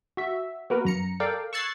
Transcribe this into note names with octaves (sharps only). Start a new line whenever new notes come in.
F#4 E5
A#3 B3 F#4 A#4 B4
F#2 A#5 C#7
A4 A#4 D5 F5 G5
C#6 E6 F#6 G#6 A6 C7